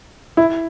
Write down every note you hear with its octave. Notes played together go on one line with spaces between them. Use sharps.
E4